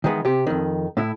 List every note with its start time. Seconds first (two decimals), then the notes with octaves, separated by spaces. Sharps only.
0.04 D#3 E3 G#3 B3
0.25 C3 G4
0.47 F2 D#3
0.97 A2 E4